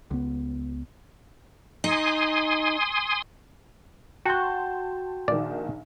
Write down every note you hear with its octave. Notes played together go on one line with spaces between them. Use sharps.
C#2 B3
D#4 G#5 C6 D#6
F#4 G5 A5 C6 G6
A#1 D#3 D5